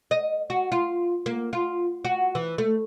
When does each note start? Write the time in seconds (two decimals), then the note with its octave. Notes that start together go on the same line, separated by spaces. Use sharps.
0.11 D#5
0.50 F#4
0.72 F4
1.26 A#3
1.53 F4
2.05 F#4
2.35 E3
2.58 A3